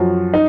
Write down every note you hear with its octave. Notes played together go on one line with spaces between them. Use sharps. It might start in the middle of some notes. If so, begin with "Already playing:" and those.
Already playing: F#2 F3 F#4
D#4